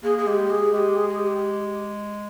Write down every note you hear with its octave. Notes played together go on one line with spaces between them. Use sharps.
A#3 G#4
G#4
G#3 G4
G#4
G#3 G4
G#4
G#4
G4